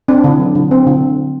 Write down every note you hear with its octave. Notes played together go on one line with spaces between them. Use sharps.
C4 D4
D3
F#3
D3
C4
D3